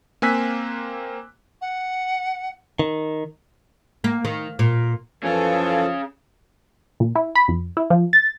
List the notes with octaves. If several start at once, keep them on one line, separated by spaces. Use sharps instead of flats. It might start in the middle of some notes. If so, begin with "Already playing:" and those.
A#3 C4 G#5 E6 F#6 B6
F#5
D#3
A#3
D#3
A#2
F#2 E3 F3 C#4 G#4 A4
A#2
E4
B5
F2
E4
F3
A6